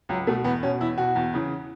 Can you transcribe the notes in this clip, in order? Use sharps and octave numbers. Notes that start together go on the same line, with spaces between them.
C#2 F#3
B2 A3
E2 B3
B2 C#4
E2 E4
B2 F#4
E2
C#3 E3